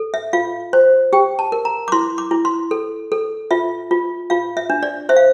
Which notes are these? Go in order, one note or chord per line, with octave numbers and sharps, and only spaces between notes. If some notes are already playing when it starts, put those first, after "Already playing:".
Already playing: A4
E5
F4 F5
C5
G4 G5
A5
A#4
A#5
D6
E4 C6
D6
E4
C6
A4
A4
F4 E5
F4
F4 F5
E5
D4
D5
C5 E5
F5